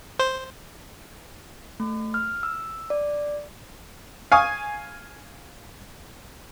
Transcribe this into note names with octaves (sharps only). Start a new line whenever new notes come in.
C5
A3
F6
E6
D5
F5 G#5 C#6 D#6